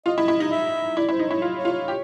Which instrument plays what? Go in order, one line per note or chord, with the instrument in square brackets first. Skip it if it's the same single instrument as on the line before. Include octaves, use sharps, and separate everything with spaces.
[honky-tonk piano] F4 [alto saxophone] D#5
[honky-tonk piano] E4
E4
D#4
[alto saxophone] E5
[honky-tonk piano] E4 [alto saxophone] D5
[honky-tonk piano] E4
[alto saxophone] C5
[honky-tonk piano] D#4
[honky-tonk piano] E4 [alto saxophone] C#5
[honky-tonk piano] F4
[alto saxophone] C#5
[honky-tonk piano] F4
[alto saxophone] C#5
[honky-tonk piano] G4